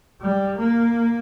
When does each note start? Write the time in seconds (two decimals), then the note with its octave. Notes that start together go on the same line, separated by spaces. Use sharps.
0.21 G3
0.59 A#3